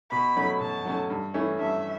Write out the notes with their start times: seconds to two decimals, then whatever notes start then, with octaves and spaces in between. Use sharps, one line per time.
0.11 B2 B5
0.37 F#3 A3 C#4
0.60 B2 A5
0.85 F#3 A3 C#4
1.10 G2
1.34 E3 A3 C#4 E4
1.59 G2 E5